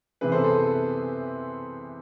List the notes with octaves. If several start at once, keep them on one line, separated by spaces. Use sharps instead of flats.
C3 E3 B3 G#4 B4
A4 C5
A4 C5